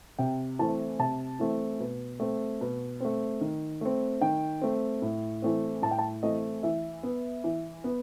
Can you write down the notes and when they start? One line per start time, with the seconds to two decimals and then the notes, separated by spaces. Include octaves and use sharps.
0.19 C3 G5
0.59 E3 A3 C4 A5
0.99 C3 A5
1.39 E3 A3 C4
1.80 B2
2.20 A3 C4
2.61 B2
3.01 A3 C4
3.41 D#3
3.81 A3 C4
4.21 D#3 G5
4.62 A3 C4
5.02 A2
5.42 E3 A3 C4
5.82 A2 A5
5.91 G5
5.99 A5
6.23 E3 A3 C4 D#5
6.63 E3 E5
7.03 B3
7.44 E3
7.84 B3